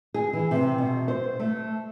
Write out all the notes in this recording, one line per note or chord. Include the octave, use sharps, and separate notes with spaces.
G#4
E3
C3
B2
C5
A3